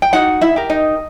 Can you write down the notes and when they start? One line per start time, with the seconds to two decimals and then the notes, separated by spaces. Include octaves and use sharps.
0.02 G5
0.13 D#4 F#4 F#5
0.41 E4 E5
0.56 G4 A#4
0.70 D#4 D#5